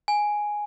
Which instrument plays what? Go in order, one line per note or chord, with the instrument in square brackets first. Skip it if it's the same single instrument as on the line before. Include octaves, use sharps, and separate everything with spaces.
[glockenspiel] G#5